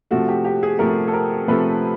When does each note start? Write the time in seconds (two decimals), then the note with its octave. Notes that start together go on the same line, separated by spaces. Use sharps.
0.11 C3 F3 A3 F#4
0.28 G4
0.44 G4
0.63 G#4
0.79 C3 F3 A3 A#4
1.07 A4
1.13 A#4
1.47 C3 F3 A3 B4